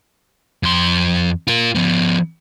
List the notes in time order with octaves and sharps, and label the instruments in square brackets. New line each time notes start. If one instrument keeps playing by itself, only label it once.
[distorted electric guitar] F2 C6
F4 A#4
F3 B3